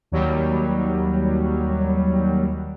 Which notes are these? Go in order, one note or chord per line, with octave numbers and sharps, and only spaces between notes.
D#2 F#3 G3